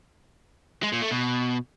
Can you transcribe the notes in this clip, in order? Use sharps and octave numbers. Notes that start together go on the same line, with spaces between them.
G#3
A#2
A3
B2